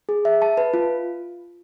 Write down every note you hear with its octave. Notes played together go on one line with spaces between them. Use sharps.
G#4
E5
A5
B4
F4